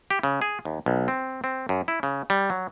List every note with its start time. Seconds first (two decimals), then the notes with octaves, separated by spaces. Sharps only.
0.10 G4
0.23 C#3
0.42 G#4
0.65 D#2
0.86 B1
1.08 C4
1.44 C4
1.69 F#2
1.88 E4
2.03 C#3
2.30 G3
2.50 F#3